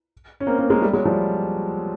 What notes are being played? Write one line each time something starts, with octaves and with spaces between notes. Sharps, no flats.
C#4
A#3 C4
A#3 C4
G#3 A#3
G3 A3
F#3 G#3
F3 G3